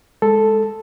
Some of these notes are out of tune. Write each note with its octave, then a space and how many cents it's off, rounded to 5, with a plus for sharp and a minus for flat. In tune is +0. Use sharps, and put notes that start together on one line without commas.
G#3 +0 A4 +0